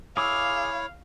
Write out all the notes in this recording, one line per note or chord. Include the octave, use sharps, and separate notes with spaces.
E4 G#4 C#5 F5 D6 E6